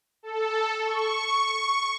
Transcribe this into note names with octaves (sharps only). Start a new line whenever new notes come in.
A4
C#6